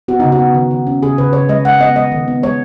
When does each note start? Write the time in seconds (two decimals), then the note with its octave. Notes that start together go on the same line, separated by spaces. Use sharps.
0.08 B3 F#4
0.20 C#3 D#4
0.32 F#4
0.40 B3
0.55 D#3
0.71 D#3
0.87 C#4
1.02 C#3 G#4
1.18 C#3 B4
1.33 C#3 C#5
1.49 G#3 D#5
1.65 G#3 F#5
1.80 B3 D#5
1.95 G#3 D#5
2.12 D#3
2.28 B3
2.43 G#3 C#5